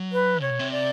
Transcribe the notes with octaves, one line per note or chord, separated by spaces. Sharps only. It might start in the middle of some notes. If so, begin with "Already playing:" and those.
Already playing: F#3
B4
C3 C#5
B2
C3
D5